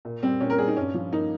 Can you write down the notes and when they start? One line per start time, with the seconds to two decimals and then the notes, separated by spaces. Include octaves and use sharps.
0.05 A#2
0.23 G3 C4
0.40 A#2 C#4
0.50 A#4
0.58 G3 G#4
0.68 D#4
0.77 G2 C#4
0.94 F3
1.12 A#3 D#4